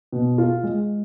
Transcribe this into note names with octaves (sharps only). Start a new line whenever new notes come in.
B2
F4
G#3